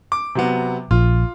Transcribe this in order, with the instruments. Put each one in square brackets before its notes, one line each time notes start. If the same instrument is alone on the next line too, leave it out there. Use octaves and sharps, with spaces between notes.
[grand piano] D6
C3 F#3 B3
[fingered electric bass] A#1 [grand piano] F4